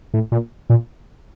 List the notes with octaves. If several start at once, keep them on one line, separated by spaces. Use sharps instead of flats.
A2
A#2
A#2